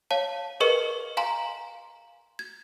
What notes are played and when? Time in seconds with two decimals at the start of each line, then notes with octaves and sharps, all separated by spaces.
0.11 C#5 F5 A5
0.60 G#4 A#4 B4 D#5 C#6 C#7
1.17 F5 G#5 A#5 C6
2.39 G#6